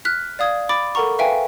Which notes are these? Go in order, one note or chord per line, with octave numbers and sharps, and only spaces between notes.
F6 F#6 B6
D5 F5 D#6 G#6
B5 D6 A6 D7
A4 A#4 F#5 A#5 C#6
B4 E5 F5 G5 G#5